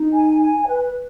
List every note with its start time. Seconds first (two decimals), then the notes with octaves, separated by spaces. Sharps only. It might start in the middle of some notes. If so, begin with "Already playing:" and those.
Already playing: D#4
0.13 G#5
0.41 G#5
0.68 B4